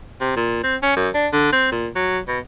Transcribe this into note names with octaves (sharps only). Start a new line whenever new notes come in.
C3
A#2
C4
C#4
F#2
D4
D3
C4
A#2
F#3
B2